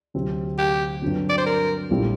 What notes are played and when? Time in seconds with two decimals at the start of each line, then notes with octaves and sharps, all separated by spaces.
0.14 D2 C3 F#3 C4 G4
0.58 G4
1.02 G2 D3 F#3 C4
1.30 D5
1.38 C5
1.46 A#4
1.90 A#1 A2 G3 C4 G4